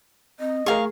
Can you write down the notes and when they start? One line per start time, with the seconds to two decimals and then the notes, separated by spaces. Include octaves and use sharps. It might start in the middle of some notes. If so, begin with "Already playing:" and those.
0.40 C4 D#5
0.66 A3 G#4 A#4 F5 C#6